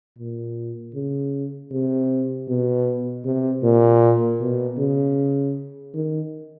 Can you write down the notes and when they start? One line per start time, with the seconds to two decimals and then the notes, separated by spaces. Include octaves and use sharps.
0.19 A#2
0.95 C#3
1.71 C3
2.49 B2
3.25 C3
3.64 A#2
4.41 B2
4.79 C#3
5.94 D#3